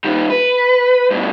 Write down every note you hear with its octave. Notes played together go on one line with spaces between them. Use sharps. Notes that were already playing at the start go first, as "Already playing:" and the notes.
D#3 G3
B4
G2 B2